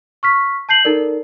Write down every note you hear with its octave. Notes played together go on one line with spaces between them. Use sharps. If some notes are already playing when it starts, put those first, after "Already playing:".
C#6 F6 B6
A5 G6 C7 F#7
D#4 A4 A#4 D5